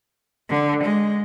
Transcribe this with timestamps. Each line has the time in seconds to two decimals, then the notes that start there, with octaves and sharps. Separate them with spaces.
0.50 D3
0.85 G#3